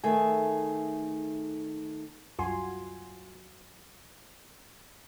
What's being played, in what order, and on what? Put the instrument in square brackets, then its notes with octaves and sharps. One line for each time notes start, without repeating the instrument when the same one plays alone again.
[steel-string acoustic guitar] D#3 A3 G#4
[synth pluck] C2 F#2 F4 F#4 G#5 C6